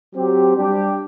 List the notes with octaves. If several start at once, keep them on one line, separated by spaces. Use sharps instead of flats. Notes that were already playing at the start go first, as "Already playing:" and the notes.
F#3 C4 G4
G3 D4 G4